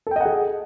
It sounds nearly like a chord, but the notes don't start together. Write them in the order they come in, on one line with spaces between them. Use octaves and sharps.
A4 G5 D#5 F#5 G#4